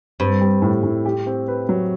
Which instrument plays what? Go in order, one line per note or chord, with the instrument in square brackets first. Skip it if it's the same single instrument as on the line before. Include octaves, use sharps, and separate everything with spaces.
[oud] G2 [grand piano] C4
[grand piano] G3
A2
A2
G4
C4
B4
F#3